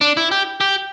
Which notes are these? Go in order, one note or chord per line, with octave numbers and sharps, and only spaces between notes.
D4
E4
G4
G4